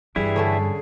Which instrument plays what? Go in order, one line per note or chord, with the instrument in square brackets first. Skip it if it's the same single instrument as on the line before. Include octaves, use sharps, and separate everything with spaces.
[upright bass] G2 [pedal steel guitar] E3 G3 E4 [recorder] G#4
[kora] D3 C#4 A4